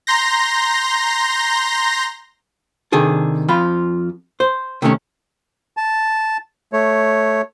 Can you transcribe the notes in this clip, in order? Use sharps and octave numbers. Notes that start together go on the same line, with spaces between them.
A#5 C6 G6 A#6
C3 D#3 D4 G#4 A4
F2 F3 F4 B5
C5
C3 D#3 A3 C#4
A5
A3 C#5